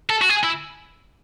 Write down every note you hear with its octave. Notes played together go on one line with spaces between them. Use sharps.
A4
F#4
G#4
E4